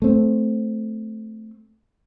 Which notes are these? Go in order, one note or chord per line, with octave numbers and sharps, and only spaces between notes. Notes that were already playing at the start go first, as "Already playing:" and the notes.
A3 C4